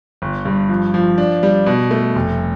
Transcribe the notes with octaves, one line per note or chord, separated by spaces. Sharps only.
G1
G2
F3
F3
D4
G3
B2
A3
F1